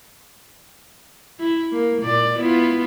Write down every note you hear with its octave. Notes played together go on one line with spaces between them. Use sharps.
E4
A#3
A#2 D5
B3 E4 F4